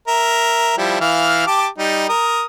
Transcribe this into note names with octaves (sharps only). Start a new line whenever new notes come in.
A#4 E5
F3 G3 E4
E3 F5 F6
G4 A5 D6
G3 D#4
A#4 D#6